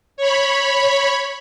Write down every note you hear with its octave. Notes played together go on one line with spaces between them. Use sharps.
C#5 B5